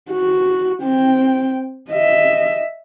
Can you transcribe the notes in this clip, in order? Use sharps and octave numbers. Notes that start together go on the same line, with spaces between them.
F#4
C4 G5
D#5 E5